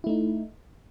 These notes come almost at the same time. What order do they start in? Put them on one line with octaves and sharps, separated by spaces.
E4 A3 D#4